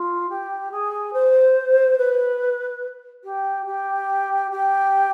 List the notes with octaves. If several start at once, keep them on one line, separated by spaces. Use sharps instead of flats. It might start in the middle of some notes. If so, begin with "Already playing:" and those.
Already playing: F4
G4
G#4
C5
B4
G4
G4
G4